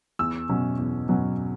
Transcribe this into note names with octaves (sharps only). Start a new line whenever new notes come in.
E2 E6
B2 F#3 C#4
E2
B2 F#3 C#4